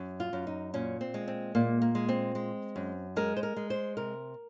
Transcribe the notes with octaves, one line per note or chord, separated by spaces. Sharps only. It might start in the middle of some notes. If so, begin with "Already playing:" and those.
Already playing: F#2
F4
F#2
D#4
A#2 C#4
C4
G#3
C4
A#2 A#3
A#3
G#3
C4
G#3
F#2
G#3 A#4
C5
A#4
G#3
C5
C3 A#4